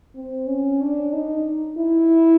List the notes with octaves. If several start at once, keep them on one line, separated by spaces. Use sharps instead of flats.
C4
C#4
D4
D#4
E4